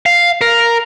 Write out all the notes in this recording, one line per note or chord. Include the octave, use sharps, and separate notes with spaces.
F5
A#4